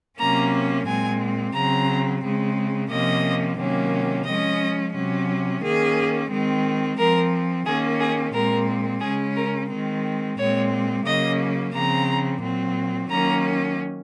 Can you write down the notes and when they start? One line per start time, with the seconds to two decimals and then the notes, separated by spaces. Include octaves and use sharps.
0.18 C3 F#3 A#3 C#4 A#5
0.86 A#2 G#3 C4 G#5
1.54 C#3 F#3 C4 A#5
2.22 C#3 G#3 C4
2.89 C3 F3 A#3 C#4 D#5
3.58 C3 D#3 F#3 A#3 C#4
4.26 F3 G#3 C#4 D#5
4.94 C3 F#3 C#4
5.62 D#3 A#3 C#4 G#4
6.29 D#3 G#3 C4
6.97 F3 C4 A#4
7.66 D#3 A#3 C#4 G#4
8.00 G#4
8.33 A#2 G#3 C4 A#4
9.02 C#3 G#3 C#4 G#4
9.36 A#4
9.69 D#3 G#3 C4
10.38 A#2 G#3 C4 C#5
11.05 C#3 F#3 A#3 C#4 D#5
11.73 C#3 F3 C4 A#5
12.41 A#2 F#3 C4
13.10 D#3 F#3 A#3 C#4 A#5